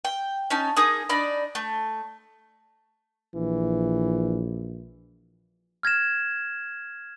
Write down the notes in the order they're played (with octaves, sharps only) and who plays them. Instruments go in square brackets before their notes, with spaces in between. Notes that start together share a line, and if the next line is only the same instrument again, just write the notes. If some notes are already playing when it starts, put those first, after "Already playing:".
[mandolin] G5
C#4 D#4 A5
A#3 D#4 G#4 D#6
D4 D#4 D5 B5
A3
[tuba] A#1 [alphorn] E3
[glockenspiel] F6 G#6 A#6 E7